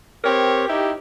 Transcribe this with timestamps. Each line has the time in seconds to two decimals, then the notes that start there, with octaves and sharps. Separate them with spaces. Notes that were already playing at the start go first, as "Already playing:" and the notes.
0.23 C4 G4 A#4 C#5
0.67 D#4 E4 G4